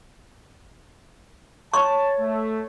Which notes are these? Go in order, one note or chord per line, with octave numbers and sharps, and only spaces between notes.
C#5 A5 C#6
A3